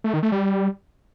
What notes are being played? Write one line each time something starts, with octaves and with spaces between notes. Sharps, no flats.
A3
D#3
A3
G3